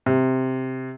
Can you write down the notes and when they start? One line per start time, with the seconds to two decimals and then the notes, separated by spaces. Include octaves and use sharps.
0.06 C3